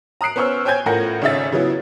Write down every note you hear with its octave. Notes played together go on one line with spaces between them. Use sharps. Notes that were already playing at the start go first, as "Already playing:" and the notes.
A#5 D#6 F#6 C7 D7
B3 C#4 C5 C#6 E6 F6
C5 C#5 G5 G#5 G6 G#6
A2 C#4 F4 A#4 F#5 A#6
G#1 C#3 C#4 D#4 E5 A6
C#3 F#3 B3 E4